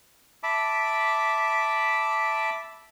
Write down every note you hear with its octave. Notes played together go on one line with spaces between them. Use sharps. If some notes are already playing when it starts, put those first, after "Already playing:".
E5 A5 B5 D6